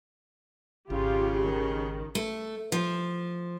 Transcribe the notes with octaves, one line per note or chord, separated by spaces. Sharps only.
G#1 C#3 F4 G4
D#3
A3
F3